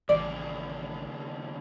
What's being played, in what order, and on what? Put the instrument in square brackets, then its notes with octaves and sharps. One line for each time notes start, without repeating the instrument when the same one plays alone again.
[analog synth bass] A1 [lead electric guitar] D#2 C#3 [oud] D5